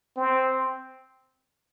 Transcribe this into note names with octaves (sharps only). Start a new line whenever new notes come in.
C4